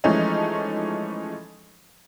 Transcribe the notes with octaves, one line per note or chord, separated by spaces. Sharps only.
E3 F3 G#3 A3 C#4 D#4